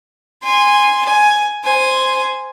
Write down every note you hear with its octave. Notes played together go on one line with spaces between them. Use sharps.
G#5 C6
G#5
C5 G#5